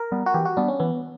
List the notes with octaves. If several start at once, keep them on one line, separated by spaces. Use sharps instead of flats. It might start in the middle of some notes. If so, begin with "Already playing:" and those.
Already playing: A#4
G3 B3
F#4
E3 G4
F#4
G3 B3 D4
C#4
E3 B3